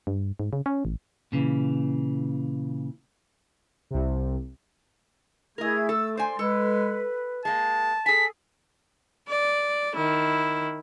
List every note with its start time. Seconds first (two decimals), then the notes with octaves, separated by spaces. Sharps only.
0.07 G2
0.39 G#2
0.53 C#3
0.66 C#4
0.85 A1
1.32 A#2 C#3 E3
3.91 C2 C3
5.58 A3 E4 G#4 A#4 D#5 G#6
5.89 A4 E6
6.17 C5 D5 G#5 C6
6.39 G#3 A4 B4
7.45 G#3 A#3 A5
8.06 G#4 A4 G#5 B6
9.28 D5
9.96 D#3 E4